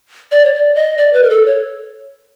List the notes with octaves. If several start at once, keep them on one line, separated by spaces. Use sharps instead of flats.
D5
C#5
D5
D#5
D5
B4
A#4
A4
C#5